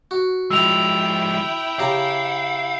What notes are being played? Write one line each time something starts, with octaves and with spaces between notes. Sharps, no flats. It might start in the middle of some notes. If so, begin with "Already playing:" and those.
F#4
F3 G#3 E4 G5 E6 F7
C#3 G4 F5 A#5